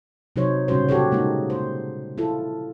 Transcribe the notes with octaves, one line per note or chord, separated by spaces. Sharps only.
C3 F#3 D#4 C5 C#5
A#2 C#3 G3 C#4 F#4 C5
F#4 G4 A4 C#5
G#3 A#3 D#4
C5
E4 F4 A4